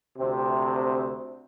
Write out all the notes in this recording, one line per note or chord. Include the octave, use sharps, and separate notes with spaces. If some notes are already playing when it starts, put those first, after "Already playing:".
D2 C3 C4